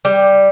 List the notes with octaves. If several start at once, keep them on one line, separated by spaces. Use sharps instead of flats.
G3